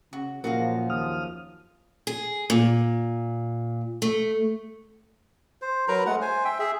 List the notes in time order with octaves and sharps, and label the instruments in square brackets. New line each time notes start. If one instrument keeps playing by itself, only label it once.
[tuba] C#3 [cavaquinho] F#4
[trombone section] F#2 F3 [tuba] A#2 [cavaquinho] F#4 G#4 F5 [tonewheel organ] A#4
[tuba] D#2 [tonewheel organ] D#6 F6
[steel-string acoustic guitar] G#4
A#2
A3
[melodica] C5
F#3 A#4 B4 A#5
G#3 A3 F#5
C5 G#5
E5 G5
G#4 E5